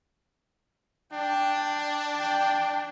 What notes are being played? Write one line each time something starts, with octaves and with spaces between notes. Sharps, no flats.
D4 G5
G5